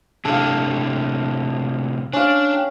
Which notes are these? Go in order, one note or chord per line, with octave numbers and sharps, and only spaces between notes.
A2 C3 D4 A4 F5
C#4 D4 F5
G5